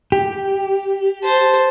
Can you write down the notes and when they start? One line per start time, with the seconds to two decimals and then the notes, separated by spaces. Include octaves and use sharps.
0.12 G4
1.24 C5 A5